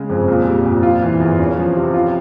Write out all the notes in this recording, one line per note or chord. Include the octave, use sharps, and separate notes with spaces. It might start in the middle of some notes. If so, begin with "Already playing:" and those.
Already playing: C#3 G#3
F2
A#2
G3
A#2
F4
E3
E2
C#4
F3
C3
F4